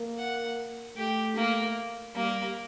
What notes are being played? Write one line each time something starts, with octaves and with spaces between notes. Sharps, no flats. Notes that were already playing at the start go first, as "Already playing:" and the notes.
Already playing: A#3
F#5
A3 G4
A#3
G3 A#3